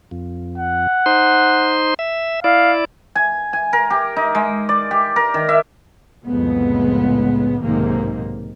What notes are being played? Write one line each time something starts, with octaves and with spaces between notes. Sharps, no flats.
F2
F#5
D#4 C5 C6
E5
E4 D5 F5
G#5
G#5
A#4
G4
D#4
G#3
D5
G4
A#4
D#3
E5
C2 F2 A2 C#3 G#3 B3
B1 G#2 C3 D#3 A#3